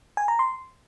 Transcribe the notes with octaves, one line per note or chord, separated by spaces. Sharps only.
G#5
A#5
C6